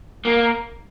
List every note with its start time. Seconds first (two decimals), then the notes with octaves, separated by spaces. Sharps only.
0.25 A#3